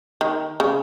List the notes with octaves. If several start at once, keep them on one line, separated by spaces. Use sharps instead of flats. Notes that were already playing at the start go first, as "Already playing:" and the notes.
D#3
C#3